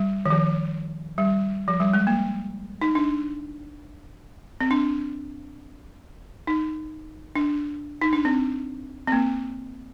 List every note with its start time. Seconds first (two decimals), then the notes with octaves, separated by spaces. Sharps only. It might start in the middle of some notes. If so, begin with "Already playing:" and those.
Already playing: G3
0.26 D#3
0.30 F3
1.18 G3
1.68 F3
1.80 G3
1.93 G#3
2.07 A#3
2.81 D#4
2.95 D4
4.60 C4
4.71 D4
6.47 D#4
7.36 D4
8.02 D#4
8.13 D4
8.25 C4
9.07 C4
9.12 A#3